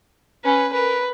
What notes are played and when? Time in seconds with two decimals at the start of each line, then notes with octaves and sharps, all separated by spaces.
0.45 C#4 B4
0.73 A#4 B4